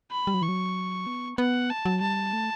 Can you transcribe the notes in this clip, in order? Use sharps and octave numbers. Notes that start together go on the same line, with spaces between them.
B5
G3
F#3
E3 C#6
F#3
B3
B3 F#5
A5
F#3
G3 A5
A3